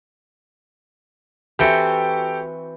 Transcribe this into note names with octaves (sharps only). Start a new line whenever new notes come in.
E3 C4 F#4 G4 A4 G5